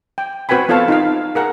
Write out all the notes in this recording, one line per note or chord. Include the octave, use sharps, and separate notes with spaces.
G5
C4 F#4 B4 G5 G#5 B5
B3 F4 A4 C#5 F5 A5
D#4 F4 F5
G#4 A#4 F#5